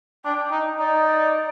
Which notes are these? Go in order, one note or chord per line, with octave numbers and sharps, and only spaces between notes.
D4 G5
D#4
D#4 D5
D5